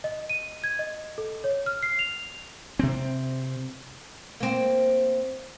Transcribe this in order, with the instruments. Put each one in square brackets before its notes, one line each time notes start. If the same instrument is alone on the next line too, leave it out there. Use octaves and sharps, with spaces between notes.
[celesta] D#5
D#7
G#6
D#5
A4
C#5
F6
C7
F7
[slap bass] C3 C4
[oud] A#3 C4